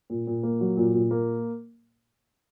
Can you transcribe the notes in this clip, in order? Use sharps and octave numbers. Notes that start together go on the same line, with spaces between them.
A#2
A#2
A#3
F#3
A#2
A#2
A#3